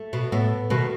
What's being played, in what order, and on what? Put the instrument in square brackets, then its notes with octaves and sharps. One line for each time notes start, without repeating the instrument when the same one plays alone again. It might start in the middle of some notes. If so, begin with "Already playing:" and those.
Already playing: [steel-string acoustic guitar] A3
[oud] B2
[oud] A2 [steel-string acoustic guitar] B3
[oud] B2 D#3 [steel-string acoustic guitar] A3